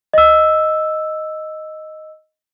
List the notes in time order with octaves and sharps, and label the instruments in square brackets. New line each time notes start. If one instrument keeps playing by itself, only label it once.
[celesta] D#5 E6